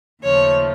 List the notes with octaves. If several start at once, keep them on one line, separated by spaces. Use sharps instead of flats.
D#2 C#3 F3 A3 C#5